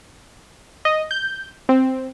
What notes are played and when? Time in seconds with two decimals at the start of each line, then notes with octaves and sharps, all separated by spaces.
0.85 D#5
1.11 G6
1.69 C4